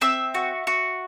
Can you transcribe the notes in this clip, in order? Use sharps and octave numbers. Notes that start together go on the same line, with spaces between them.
C4 E5 E6
F#4
F#4